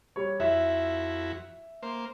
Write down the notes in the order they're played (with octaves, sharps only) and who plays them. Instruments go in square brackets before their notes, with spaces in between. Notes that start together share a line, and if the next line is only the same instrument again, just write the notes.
[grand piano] G3 C#5
[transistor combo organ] F2 E4 F#4 [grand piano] E5
[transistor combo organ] A#3 C5